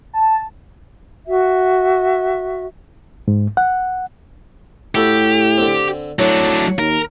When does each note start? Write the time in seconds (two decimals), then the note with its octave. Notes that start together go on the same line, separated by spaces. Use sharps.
0.13 A5
1.26 F#4 E5
3.28 G#2
3.57 F#5
4.95 A2 E4 F#4 G4 A4
5.58 D3 C4
6.19 A2 F#3 D4 C#5 F#5
6.79 D#2 A#4